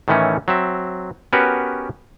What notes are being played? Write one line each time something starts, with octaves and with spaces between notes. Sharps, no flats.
A2 D#3 E3 A3 C#4
F#3 C4 E5
B3 C#4 F#4 G4 A#4 B4